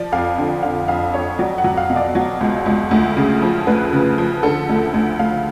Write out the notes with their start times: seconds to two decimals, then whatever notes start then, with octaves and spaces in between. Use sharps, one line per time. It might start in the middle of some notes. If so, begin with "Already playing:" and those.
Already playing: F3 D5
0.12 F2 F5
0.38 D3
0.63 D3 F5
0.88 F2 F5
1.14 F2 C#5
1.39 F#3 D5
1.58 F#5
1.64 F#3
1.77 F5
1.90 B2
1.96 D5
2.15 F#3
2.41 C#2
2.66 C#2
2.91 D2
3.17 C#3
3.42 F3
3.67 D2 B4
3.93 C#3
4.18 F3
4.43 D3 A4
4.69 D2
4.94 D2
5.19 D2 F5